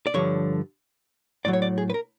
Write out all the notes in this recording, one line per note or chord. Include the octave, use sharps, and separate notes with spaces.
D5
G2 D3 F3 C#5
A2 F#3 D5
C#5
D5
G#4
B4
A#4